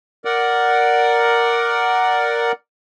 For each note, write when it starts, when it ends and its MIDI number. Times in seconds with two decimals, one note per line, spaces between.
0.25 2.52 70
0.25 2.52 74
0.25 2.52 78